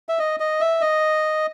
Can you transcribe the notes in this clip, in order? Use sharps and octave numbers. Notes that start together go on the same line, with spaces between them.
E5
D#5
D#5
E5
D#5